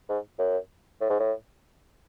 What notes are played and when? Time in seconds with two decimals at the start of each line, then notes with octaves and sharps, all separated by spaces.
0.09 G#2
0.39 F#2
1.01 A2
1.10 G#2
1.20 A2